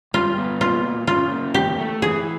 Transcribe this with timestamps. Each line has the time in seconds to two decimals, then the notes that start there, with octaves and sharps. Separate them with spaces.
0.14 G2 F4
0.38 B3
0.61 A#2 F4
0.85 A#2
1.07 C#3 F4
1.31 A#3
1.54 E2 G4
1.78 A3
2.02 E3 G#4